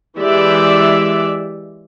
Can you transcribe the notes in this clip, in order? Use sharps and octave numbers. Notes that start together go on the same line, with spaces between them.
E3 G#3 G4 D5 E5